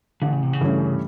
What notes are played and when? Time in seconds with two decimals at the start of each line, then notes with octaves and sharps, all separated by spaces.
0.22 A1 D3
0.33 C#3
0.43 C3
0.53 C#3
0.61 G2 E3 A3 C#4